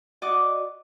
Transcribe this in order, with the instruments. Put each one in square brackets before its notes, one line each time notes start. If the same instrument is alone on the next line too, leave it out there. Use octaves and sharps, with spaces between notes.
[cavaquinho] F#4 D5 D#5 D6